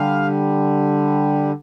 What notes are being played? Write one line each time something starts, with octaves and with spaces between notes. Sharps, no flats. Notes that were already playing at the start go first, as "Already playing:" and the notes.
Already playing: D3 G3 F5